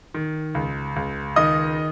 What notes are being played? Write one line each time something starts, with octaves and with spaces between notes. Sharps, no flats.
D#3
C#2
C#2
D#3 D#5 D#6